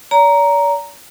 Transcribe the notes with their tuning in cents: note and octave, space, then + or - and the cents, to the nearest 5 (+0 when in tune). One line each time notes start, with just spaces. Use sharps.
D5 -45 A#5 +0